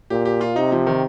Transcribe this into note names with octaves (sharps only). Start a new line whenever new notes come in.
A#2 G4
G4
F4
C3 D#4
F3
D#3